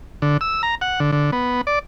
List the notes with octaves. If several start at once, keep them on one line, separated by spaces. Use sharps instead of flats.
D3
E6
A#5
F#5
D3
D3
B3
D5